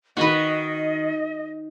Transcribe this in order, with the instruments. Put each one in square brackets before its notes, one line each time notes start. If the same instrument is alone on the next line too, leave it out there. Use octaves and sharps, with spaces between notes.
[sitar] D#3 [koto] F#4 B4 [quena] D#5